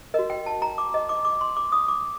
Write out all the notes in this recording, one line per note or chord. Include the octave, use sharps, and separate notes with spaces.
F#4 A#4 D#5
G5
A5
A#5
D6
D#5
D6
D6
C6
D6
D#6
D6